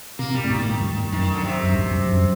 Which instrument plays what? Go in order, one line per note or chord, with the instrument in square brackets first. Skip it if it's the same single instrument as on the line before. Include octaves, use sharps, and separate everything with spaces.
[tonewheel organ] C3 [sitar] A#3
[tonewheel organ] C3 [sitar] G3
[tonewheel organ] A2
[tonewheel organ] A#2 [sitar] D#3
[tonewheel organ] A2
G2
[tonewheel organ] F#2 [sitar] D#3
[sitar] D3
C3
[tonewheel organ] F#2
G2
F#2
F#2